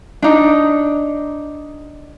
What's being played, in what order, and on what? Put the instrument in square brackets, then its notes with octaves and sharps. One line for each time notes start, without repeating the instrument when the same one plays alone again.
[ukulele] D4 D#4